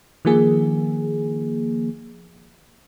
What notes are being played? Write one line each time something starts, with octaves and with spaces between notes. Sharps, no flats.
D#3 F3 A#3 G#4